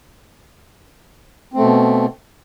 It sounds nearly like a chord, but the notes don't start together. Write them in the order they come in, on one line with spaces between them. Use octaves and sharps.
C4 A3 B2